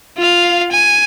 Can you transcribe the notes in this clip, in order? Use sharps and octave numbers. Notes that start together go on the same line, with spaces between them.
F4 F5
G#5